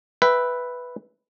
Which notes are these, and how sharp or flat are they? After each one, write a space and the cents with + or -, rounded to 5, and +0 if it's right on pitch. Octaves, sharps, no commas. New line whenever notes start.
B4 +0 E5 +0 G5 +0